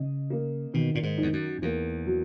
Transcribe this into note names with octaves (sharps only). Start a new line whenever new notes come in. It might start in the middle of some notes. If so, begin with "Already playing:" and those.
Already playing: C#3 D#5
A#3
B2 D#3
A#2
G#2
E2 D#4
F#2
E2 A#3
F#3